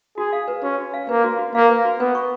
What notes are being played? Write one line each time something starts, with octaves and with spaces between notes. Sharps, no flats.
F#4 G#4
F5
B4
C#4 F#4
F#4
F5
A#3 B4
F#4
F#4
A#3 F5
B4
F#4
B3 B4
C#6